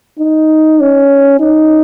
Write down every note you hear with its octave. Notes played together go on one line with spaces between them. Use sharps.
D#4
C#4
D#4